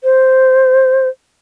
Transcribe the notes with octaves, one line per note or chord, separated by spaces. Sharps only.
C5